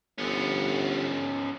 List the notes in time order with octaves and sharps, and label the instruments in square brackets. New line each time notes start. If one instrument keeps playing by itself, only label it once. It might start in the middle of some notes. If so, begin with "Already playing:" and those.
[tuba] G1 [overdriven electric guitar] F3 C#4